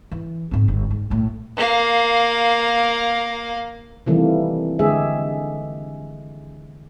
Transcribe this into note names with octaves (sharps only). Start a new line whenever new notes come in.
E3
G#2 C4
G1
G#2
B1 A2
A#3 F5
C3 D#3 E3 G3 A3 A#3
D3 G#3 G4 G#4 E5